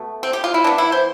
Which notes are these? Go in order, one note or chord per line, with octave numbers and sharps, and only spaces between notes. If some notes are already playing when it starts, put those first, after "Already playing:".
Already playing: B2 A3
C4
G4
F4
E4
E3 B3 D4
E4
C5